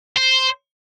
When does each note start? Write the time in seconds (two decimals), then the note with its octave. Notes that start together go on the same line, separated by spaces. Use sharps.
0.17 C5